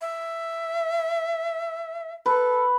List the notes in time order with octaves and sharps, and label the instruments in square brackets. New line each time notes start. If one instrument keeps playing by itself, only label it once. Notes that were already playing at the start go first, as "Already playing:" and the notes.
[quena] E5
[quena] A4 [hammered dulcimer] B4